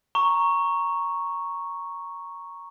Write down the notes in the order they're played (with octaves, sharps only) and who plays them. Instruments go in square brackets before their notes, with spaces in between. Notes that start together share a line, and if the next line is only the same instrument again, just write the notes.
[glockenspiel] A#5 C#6